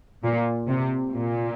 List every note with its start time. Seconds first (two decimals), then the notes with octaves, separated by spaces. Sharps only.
0.24 A#2
0.69 C3
1.13 A#2